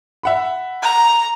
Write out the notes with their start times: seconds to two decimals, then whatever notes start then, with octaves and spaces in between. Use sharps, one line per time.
0.23 E5 F#5 B5
0.82 A#5